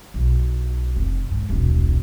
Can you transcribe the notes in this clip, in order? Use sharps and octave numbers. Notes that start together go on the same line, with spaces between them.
B1
F1
G#2
D#1 B1